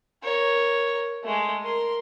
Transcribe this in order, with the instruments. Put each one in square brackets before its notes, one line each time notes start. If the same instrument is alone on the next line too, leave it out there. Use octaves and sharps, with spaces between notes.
[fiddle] A#4 C#5
G#3 A3
A#4 C6